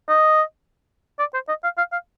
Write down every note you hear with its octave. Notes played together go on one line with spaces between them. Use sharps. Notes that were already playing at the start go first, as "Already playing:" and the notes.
D#5
D5
C5
D#5
F5
F5
F5